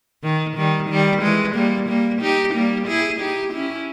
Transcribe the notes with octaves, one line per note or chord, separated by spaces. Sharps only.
D#3
D#3 G3
D#3 G3
E3 G#3
G3 A#3
G3 A#3
D#4 G4
G3 A#3
E4 G#4
D#4 G4
C#4 E4